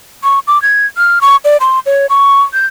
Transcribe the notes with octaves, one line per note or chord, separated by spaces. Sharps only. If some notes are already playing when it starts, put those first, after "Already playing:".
C#6
D6
G#6
F6
C#6
D5
C6
C#5
C#6
G6